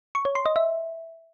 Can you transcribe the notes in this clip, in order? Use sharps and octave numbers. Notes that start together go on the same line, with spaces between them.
C#6
C#5
C6
D#5
E5